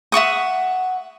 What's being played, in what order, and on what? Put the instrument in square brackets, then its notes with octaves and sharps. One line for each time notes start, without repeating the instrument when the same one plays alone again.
[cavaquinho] E5 F#5 C#6 D#6